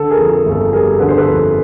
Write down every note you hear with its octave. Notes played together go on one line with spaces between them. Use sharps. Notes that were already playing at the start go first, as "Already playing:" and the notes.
Already playing: D3 A4
G#4 A#4
F2
G#4
G1
A4
G3 G#4 A#4
D3 B4
C5
A4 B4
F2